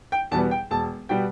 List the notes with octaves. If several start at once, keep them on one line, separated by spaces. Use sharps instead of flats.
G5
E2 B2 G3 B3 A5
G5
E1 A5
B2 G3 B3 G5